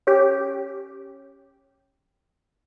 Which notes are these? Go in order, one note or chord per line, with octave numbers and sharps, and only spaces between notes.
C#4 G4